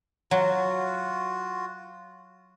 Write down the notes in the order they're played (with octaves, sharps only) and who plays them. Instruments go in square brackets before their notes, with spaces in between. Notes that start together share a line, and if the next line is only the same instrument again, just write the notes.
[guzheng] F#3 [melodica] F4 F#4